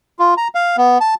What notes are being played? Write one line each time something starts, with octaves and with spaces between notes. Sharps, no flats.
F4
A#5
F5
B3
A5